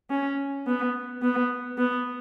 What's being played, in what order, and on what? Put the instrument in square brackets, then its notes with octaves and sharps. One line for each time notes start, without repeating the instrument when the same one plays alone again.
[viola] C#4
B3
B3
B3